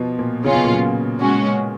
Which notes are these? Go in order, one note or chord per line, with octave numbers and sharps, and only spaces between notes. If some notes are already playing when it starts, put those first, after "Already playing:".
Already playing: B2 F3
A#2
C#3 F#3 C#4 F4
B2
A#2
B2
G#3 C#4 F#4